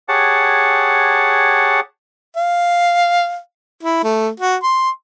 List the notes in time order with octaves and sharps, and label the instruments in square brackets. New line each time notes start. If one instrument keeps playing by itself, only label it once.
[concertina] G4 G#4 C#5 F#5 A5
[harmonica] F5
E4
A3
F#4
C6